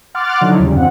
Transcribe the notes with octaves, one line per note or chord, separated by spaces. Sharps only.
F#5 C6 D6 F6 F#6 A6
D3 F3 F#3 D#4 E4
D#2 C#3 G3
E2 G2 C4 F4 F#5